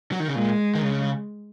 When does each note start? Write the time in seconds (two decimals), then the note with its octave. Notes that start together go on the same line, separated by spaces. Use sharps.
0.12 F#3
0.20 D#3
0.28 C#3
0.35 A#2 G#3
0.75 D#3
0.82 C#3